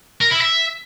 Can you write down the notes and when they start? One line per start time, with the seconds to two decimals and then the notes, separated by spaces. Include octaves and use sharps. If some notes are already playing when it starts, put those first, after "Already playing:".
0.21 A#4
0.31 E4
0.41 E5